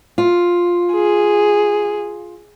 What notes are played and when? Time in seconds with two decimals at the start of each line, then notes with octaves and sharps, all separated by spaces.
0.18 F4
0.93 G#4